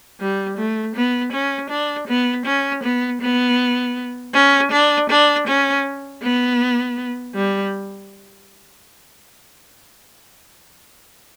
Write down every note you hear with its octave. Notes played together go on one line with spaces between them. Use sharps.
G3
A3
B3
C#4
D4
B3
C#4
B3
B3
C#4
D4
D4
C#4
B3
G3